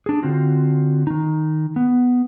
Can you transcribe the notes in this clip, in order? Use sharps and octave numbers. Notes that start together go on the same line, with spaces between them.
D4 G#4
D3 C4 F4 F#4
D#3 D#4
B3